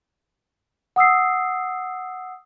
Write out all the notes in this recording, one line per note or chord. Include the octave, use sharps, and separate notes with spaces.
F#5 D#6 E6 C7